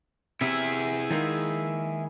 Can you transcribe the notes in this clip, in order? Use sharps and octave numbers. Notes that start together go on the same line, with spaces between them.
C3 E4 G#4
D#3 G#3 A#3